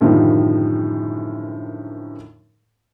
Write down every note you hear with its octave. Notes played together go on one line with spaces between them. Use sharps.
F#2 A2 D3 D#3 F3 G3